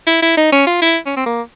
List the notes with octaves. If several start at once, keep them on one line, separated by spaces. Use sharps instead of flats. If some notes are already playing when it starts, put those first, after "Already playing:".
E4
E4
D#4
C#4
F4
E4
C#4
C4
A#3